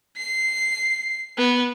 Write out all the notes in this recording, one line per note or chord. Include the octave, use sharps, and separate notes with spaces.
C7
B3